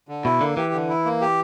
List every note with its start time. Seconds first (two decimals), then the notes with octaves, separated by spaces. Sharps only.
0.08 D3
0.24 B2 E4
0.41 D3 A#3
0.57 E3 G4
0.73 D3
0.89 E4
1.05 A#3
1.21 G4